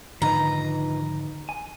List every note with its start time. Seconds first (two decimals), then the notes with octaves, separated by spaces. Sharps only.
0.22 G#2 D3 D#3 F3 D#4 B4 A#5
1.49 G#5